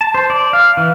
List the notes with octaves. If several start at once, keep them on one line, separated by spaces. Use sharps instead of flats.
A5
C5
D5
F5
E3